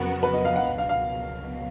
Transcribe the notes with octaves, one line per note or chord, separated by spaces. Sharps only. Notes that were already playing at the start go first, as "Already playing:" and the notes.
Already playing: F2 C#3 F#3 B3 F#4 A#4
B4
D#5
F5
F#5
C#2 B2 F#3
F5
F5